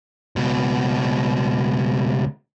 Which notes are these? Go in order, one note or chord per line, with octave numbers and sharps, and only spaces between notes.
C#2 B2